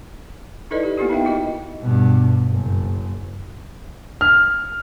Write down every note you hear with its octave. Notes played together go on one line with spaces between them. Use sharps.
D#4 E4 A4 B4 D5 D#5
G4
A#3 B3 E4 F4 G4
D#4 A#4 E5 F5 G5
D#4 F#4 D#5
G2 B2
F#1
F6